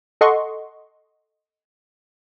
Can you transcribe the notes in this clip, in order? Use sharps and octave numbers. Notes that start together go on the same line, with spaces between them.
A4 D#5 F#5 C6 C#6